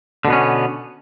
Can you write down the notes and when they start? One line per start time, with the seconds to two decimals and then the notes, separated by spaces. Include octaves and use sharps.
0.25 D3
0.27 B2
0.30 B3
0.33 C#4